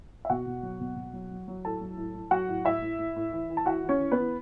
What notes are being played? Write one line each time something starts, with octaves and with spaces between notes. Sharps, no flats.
E5
B2 F#4 F#5
B2
F#3
B2
B2
F#3
F#3
F#3
A2 A4 A5
F#3
A2
A2
F#3 F#4 F#5
A2
A2 E4 E5
A2
A2
A2
E3
E3
A5
E3 F#4 F#5
E3
C#4 C#5
E3
B3 B4
E3